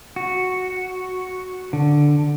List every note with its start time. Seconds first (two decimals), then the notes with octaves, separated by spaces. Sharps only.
0.16 F#4
1.73 D3